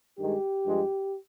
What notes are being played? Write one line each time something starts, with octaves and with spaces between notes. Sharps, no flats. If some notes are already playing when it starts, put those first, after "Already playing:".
G2 D#3 G#3 G4
G2 F3 G#3